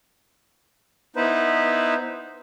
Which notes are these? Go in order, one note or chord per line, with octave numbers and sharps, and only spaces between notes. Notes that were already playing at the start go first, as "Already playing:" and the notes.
B3 D#4 E4 B4 C5